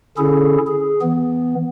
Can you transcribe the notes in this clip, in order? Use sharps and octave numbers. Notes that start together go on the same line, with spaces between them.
D3 C#4 E4 G#4 A4
G#4
E3 B3